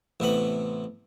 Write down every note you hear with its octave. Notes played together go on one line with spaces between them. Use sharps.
A1 C3 B3 B5